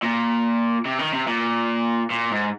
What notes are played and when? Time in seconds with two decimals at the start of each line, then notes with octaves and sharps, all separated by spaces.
0.02 A#2
0.86 C3
0.99 D#3
1.13 C3
1.28 A#2
2.11 A#2
2.31 G#2